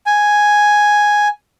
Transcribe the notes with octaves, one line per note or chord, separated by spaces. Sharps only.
G#5